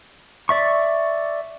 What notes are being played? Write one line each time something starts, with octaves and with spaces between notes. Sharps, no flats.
D5 E5 C#6